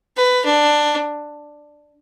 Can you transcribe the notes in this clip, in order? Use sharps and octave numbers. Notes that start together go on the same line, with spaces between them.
B4
D4